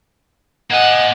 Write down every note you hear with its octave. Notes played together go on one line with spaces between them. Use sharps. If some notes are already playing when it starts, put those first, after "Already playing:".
A#3 D#5 F#5 G#5